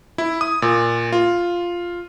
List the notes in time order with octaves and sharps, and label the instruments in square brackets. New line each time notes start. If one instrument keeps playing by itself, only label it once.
[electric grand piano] E4
D#6
A#2
F4